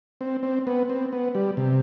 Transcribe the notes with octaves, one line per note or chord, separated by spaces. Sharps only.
C4
C4
B3
C4
B3
G3
C3